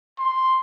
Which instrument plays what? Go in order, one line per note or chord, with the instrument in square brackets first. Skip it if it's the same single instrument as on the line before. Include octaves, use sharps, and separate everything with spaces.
[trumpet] C6